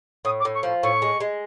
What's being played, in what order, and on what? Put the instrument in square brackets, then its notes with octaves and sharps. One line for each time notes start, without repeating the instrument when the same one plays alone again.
[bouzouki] A2 [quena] D#6
[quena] D6
[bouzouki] A2
[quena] C#6
[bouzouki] F3
[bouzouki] A2 [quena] C#6
[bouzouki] G#3
G#3